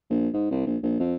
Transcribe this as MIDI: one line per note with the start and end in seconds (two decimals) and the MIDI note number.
0.10 0.29 34
0.33 0.48 44
0.51 0.63 36
0.67 0.77 34
0.83 0.99 34
1.00 1.16 41